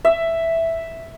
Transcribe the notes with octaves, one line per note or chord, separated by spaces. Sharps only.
E5